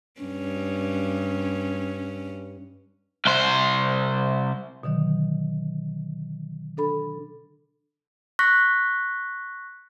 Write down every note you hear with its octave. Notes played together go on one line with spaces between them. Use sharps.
G2 C#4
C2 C5
B2 D3 D#3 F#3
D4 A4 B5
C#6 F#6 A#6 B6